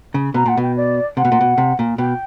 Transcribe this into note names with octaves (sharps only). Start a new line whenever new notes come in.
C#3
B2 A#5
A#2 F#5
B2 G5
D5
C3 F#5
B2
A#2
B2
C3
A#2
B2 G5